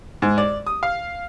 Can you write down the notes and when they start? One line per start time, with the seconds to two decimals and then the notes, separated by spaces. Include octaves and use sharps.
0.22 G#2
0.38 D5
0.67 D#6
0.83 F5